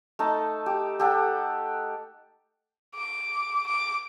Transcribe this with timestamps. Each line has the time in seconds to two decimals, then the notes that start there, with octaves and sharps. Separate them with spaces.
0.19 A3 D#4 A5
0.66 G4
1.00 G4 A4 F#5
2.95 D6
3.66 D6